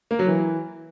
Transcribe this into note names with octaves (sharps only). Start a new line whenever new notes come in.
A#3
F#3
E3